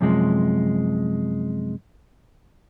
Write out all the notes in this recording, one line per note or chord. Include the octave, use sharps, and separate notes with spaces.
F#2 C3 F3 G#3